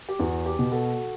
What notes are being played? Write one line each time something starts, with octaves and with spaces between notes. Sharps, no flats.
G4
E2 F#4
G4
B2
F#4 A4